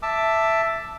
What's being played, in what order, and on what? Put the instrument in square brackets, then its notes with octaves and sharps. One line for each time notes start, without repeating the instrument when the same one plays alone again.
[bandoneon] E5 A5 D6 E6